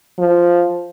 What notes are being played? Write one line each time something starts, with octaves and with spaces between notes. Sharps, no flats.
F3